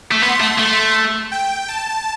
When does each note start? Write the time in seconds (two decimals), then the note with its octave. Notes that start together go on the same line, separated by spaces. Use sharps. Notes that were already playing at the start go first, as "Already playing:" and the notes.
0.11 A3
0.22 B3 C6
0.41 A3
0.59 A3
1.31 G5
1.68 A5